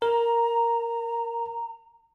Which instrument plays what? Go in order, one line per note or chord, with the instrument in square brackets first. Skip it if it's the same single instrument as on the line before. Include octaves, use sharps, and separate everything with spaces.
[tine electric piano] A#4 [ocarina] A#5